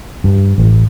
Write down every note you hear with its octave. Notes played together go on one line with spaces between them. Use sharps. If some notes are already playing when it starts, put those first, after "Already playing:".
G2
A1